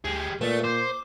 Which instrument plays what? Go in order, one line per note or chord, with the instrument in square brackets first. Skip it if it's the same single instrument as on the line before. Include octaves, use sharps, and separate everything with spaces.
[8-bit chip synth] D2 [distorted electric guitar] G3 G#4
[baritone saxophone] A#2 [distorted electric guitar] A3 [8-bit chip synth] B4 D5
[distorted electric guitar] C5 [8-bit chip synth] D6